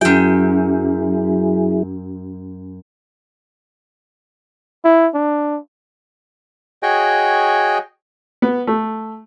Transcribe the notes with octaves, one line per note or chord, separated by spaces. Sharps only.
F#2 F#3 E4 G#4 G5
E4
D4
F#4 G#4 C#5 D#5 G5
B3
A3